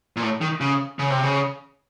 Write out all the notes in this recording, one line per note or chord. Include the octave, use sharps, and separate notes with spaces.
A#2
A2
D#3
C#3
C#3
C3
C#3